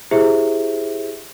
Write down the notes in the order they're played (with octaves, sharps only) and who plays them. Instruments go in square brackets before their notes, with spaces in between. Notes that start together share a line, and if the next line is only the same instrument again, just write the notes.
[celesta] E4 G4 G#4 C5 E5